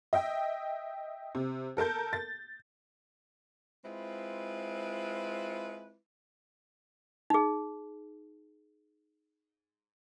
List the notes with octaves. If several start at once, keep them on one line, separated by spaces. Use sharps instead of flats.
D#5 E5 G5
C3
A4 A#4 A5 G6
A6
G#3 C4 E4 F4 B4
D#4 G#4